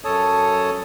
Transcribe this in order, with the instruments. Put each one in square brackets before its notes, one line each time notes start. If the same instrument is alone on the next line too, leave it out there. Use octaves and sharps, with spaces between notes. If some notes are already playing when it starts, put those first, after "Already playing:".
[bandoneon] F#2 A4 C#5 A5 D#6